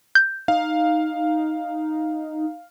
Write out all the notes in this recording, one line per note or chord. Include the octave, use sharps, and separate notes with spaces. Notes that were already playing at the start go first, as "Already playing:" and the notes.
G6
D#4 F5